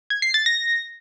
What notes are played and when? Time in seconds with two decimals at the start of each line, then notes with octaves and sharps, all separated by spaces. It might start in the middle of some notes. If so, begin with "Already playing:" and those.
0.10 G#6
0.22 C7
0.34 A6
0.46 A#6